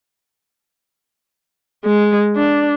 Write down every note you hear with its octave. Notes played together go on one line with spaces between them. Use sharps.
G#3
D4